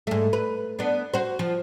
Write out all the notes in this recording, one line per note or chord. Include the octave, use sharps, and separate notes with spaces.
G#2 A3
B4
B3 D4
F#4 C5
F3